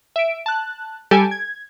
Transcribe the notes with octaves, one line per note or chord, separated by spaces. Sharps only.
E5 D7
A5 F#6
G3 G4 A4 G#5 A5 D7
G#6